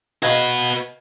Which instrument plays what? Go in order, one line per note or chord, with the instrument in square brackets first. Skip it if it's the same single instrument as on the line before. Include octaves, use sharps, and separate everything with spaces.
[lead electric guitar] F#4 B4 [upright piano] D#5 F5 G#6